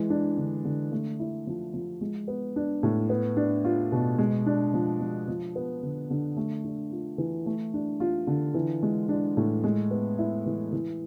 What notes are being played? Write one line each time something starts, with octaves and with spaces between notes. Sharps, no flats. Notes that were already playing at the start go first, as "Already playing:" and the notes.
Already playing: E3 G#3
D4
D3
D3
A3
E4
F3
F3
G#3
B3
D4
A2
B3
D4
F4
B2
G#3
D4
F3
F3
F3
B3
D3
D3
A3
D4
F4
E3
A3
D4
F4
D3
E3
G#3
D4
A2
G#3
B3
E4
E3
E3